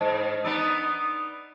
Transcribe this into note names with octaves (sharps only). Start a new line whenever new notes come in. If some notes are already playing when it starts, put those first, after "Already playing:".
G#2 C5 D#5 A5
B3 D#4 D5 E6